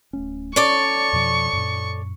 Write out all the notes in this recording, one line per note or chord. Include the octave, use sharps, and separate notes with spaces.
D1 A3 C#4
C#4 A4 C#5 D5 C#6
F2 B2 F3
F#2 A#2